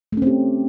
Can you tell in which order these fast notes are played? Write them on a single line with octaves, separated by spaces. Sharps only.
A3 C#4 C4 G4